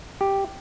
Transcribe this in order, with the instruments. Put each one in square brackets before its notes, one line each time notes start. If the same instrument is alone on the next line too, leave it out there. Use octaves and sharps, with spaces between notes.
[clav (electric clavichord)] G4